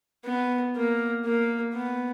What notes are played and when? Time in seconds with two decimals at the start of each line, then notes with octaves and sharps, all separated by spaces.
0.25 B3
0.76 A#3
1.25 A#3
1.74 B3